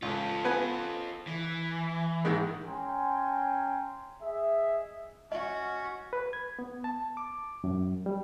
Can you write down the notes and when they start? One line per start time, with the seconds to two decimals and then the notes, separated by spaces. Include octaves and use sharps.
0.02 C#2 F4 A4
0.45 B3 B4 G#5
1.27 E3
2.25 G#2 D#3 G#3
2.68 C#4 G5 G#5 A#5 C6
4.23 G#4 D#5 E5
5.32 C#4 F#4 D#5
6.13 B4
6.33 G#6
6.59 B3
6.84 A5
7.17 D6
7.64 F#2
8.06 G3